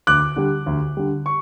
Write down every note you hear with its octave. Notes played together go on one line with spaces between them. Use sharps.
D2 D6 F#6
D3 G3
D2
D3 G3
C#6